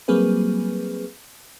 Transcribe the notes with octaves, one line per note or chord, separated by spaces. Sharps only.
F#3 G3 A#3 C4 G#4 B4